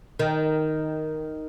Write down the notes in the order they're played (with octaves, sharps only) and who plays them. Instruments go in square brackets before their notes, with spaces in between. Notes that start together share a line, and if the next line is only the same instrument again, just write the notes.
[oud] D#3